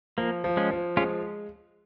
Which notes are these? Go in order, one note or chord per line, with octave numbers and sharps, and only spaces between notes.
F3 A#3
F3
G#3 C#4
F3
G#3 C#4 F4